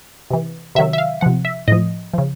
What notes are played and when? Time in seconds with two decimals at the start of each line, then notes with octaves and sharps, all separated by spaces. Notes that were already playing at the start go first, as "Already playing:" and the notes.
0.30 C3 E3
0.75 C3 D#3 F#3 E5
0.93 E5
0.98 F5
1.21 C3 F3 F#5
1.45 E5
1.68 A2 F3 D#5
2.14 C#3 F3